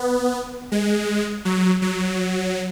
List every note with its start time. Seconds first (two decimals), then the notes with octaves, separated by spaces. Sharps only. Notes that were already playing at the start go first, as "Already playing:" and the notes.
Already playing: B3
0.72 G#3
1.45 F#3
1.82 F#3